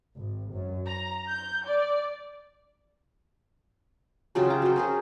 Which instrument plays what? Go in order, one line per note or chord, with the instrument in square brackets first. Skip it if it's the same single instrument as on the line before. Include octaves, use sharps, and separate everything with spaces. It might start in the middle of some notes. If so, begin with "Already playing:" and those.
[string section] G#1
F#2
A#5
G6
D5
[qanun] C#3 F#3 F4 G4
A#5
F#3 C5
C#4 G#4 A#4